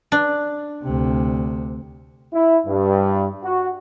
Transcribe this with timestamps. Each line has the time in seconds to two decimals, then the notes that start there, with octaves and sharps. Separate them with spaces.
0.12 D4
0.84 D2 C3
2.34 E4
2.67 G2
3.44 F#4